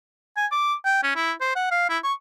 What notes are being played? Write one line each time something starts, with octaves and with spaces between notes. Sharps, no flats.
G#5
D6
G5
C#4
E4
C5
F#5
F5
E4
C#6